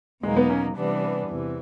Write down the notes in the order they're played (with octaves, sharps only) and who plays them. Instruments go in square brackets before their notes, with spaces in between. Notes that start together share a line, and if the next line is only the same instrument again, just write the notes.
[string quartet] E2 B2 F#3 A#3 D#4 [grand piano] G#3
[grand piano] B3
C#4
[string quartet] C3 E3 G3 B3 D4
E2 C3 E3